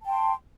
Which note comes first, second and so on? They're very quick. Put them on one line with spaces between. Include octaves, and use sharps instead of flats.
A5 G5 C6